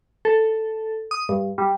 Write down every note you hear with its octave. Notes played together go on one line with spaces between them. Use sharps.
A4
D#6
G2
G3